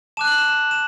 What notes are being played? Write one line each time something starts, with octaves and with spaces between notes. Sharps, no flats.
A5 D6 F#6 E7
F#7
E7
E7
E7